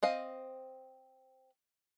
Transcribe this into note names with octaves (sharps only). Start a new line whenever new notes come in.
C4 D#5 F5